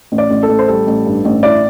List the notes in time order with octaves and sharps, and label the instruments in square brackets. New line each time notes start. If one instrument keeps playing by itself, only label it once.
[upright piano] A1
[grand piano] D5
[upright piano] A1
[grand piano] A4
[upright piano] A1
[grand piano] C5
[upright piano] G3 [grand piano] A4
[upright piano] A1
G2
A1
[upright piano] E4 [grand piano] D5